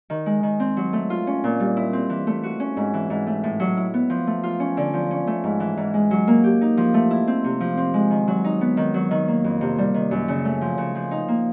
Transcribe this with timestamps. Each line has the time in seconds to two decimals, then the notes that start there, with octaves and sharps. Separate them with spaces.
0.10 D#3
0.26 G#3
0.43 D#3
0.60 C4
0.77 F#3
0.93 A3
1.10 F4
1.27 C#4
1.44 A#2
1.60 G3
1.77 E4
1.93 C4
2.10 E3
2.27 A3
2.43 F#4
2.60 C#4
2.77 G#2
2.94 E3
3.10 G#2
3.27 A3
3.44 A2
3.60 F#3
3.77 E4
3.94 B3
4.10 F3
4.27 A3
4.43 F4
4.60 C#4
4.77 D3
4.94 F3
5.11 C#4
5.27 A3
5.44 G#2
5.60 E3
5.77 G#2
5.94 G#3
6.11 F#3
6.27 A#3
6.44 G4
6.61 D#4
6.77 F3
6.94 A3
7.11 E4
7.28 C4
7.44 C3
7.60 F3
7.77 C4
7.94 G#3
8.11 D#3
8.28 F#3
8.44 D#4
8.61 B3
8.77 D#3
8.94 F#3
9.11 D#3
9.28 A#3
9.44 F2
9.61 C3
9.78 G3
9.94 D#3
10.11 F#2
10.28 C#3
10.45 A3
10.61 F3
10.78 C#3
10.95 F3
11.11 D#4
11.28 A#3